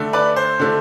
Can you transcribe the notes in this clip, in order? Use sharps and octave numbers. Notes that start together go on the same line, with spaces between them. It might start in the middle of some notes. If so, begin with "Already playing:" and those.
Already playing: D3 A3
B4 D5
C5
D3 A3